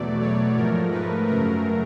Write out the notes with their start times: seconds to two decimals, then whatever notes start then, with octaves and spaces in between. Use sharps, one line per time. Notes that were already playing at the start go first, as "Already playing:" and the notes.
Already playing: E2 B2 F#3 A3 D5
0.21 C#5
0.57 G#2 F3 A3 A#4
0.92 B4
1.27 F#2 C#3 F#3 A3 A#4